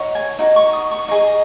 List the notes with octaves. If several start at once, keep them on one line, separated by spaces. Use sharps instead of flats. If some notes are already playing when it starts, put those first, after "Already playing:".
Already playing: D#4 F#4 C#5
G#5
D#4 F#4
C#6
D#6
C#6
D#4 G#4 D#5 C#6